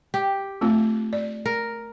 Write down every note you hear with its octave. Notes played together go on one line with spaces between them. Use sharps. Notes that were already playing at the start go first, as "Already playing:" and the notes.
G4
A3 C4 F4
D5
A#4